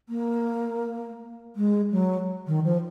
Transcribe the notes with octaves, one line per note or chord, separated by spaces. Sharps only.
A#3
G#3
F#3
D#3
F3